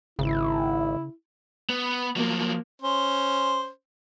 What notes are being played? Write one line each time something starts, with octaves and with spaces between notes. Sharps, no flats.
G#1 C#3 E4
B3
F3 F#3 A#3
C#4 C5